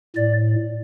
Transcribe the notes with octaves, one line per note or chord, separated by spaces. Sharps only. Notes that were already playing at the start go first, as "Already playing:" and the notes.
A2 D5